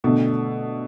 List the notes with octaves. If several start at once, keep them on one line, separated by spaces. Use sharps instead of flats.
B2 D3 A3 D4 A4